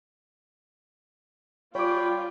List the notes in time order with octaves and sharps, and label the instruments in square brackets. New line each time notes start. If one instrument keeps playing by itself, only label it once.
[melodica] G3 G5 B5 [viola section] F4 [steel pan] C#5 D6